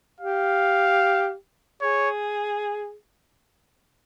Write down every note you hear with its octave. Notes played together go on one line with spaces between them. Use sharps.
G4 F5
G#4 C#5